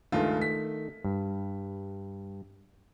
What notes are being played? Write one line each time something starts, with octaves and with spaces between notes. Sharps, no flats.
C#2 G2 D#3 A3 F4
B6
G2